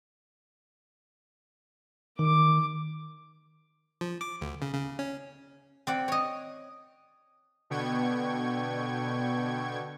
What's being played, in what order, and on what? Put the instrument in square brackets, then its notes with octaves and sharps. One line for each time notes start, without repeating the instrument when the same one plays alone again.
[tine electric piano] D#3 [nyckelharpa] D6
[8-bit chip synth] F3
D6
D2
C#3
C#3
C#4
[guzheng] C4 D5 F#5
C#5 D#5
[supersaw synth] B2 D3 B3 G5 C#6 G#6